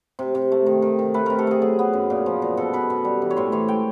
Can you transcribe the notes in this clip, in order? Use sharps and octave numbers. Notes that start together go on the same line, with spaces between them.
C3
C3
A3
D#3
D#3
D#3
A3 B4
C3 A#4
A4
A3 G#4
F#3 G#4
B3
F#2
A#2
F3
A#2
B2 A4
B2 B4
B2
G3
E3
C#5
A2 C5
E3 C#5
G#3 G5